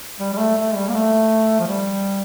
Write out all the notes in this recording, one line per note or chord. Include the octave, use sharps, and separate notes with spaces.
G3
G3
A3
A3
G3
A#3
A3
F3
G3